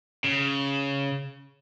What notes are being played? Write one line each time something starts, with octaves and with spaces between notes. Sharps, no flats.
C#3